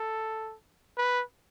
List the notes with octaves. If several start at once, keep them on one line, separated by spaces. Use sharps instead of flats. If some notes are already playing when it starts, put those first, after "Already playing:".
Already playing: A4
B4